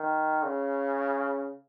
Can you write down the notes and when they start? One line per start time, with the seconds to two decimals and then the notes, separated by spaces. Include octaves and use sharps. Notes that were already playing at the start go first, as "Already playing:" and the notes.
Already playing: D#3
0.43 C#3